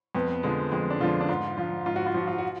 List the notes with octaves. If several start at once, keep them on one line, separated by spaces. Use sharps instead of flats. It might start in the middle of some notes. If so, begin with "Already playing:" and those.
F2 B3
D3 F3 G#3
F2 G#3
D4
D3 F3 F4
D4
G#2 F4
F3 F4
G#2 F4
F#4
F4
F3 F#4
F4
F#4